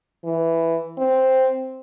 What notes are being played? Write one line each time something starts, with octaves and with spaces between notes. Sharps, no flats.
E3
C4